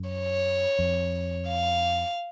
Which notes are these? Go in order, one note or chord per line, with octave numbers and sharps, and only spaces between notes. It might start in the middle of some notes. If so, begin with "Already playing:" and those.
Already playing: F#2
C#5
F2
F5